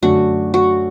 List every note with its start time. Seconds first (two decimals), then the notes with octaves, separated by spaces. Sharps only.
0.02 F#2 D3 A3 D4 F#4
0.54 F#4